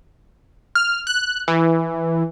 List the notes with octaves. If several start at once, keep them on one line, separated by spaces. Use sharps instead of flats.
F6
F#6
E3